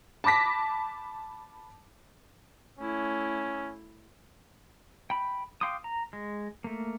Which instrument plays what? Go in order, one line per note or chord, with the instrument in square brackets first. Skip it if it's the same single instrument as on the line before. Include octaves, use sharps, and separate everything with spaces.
[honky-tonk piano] A5 B5 D6 A#6 B6
[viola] A3 E4 [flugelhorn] C#4
[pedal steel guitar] G5 B5
F5 G5 C6 D6 D#6
A#5
G#3
A3 A#3